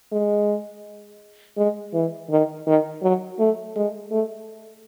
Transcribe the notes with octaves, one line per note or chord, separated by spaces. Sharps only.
G#3
G#3
E3
D#3
D#3
F#3
A3
G#3
A3